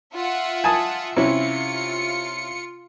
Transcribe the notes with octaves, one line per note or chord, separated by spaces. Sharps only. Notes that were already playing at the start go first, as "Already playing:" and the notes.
F4 E5 F#5
G#5 A5 D#6
C3 C#4 E4 F4 C#7